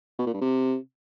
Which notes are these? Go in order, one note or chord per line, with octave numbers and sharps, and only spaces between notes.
B2
A#2
G2
C3